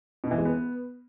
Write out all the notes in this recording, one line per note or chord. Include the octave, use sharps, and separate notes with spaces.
B2
E3
G#3
B3